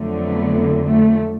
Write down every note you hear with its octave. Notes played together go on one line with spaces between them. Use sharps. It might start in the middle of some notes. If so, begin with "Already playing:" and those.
Already playing: F2 D3 F#3 A3
B3
A3